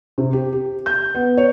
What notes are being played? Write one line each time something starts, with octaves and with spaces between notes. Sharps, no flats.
C3
G4
G4
G6
B3
C#5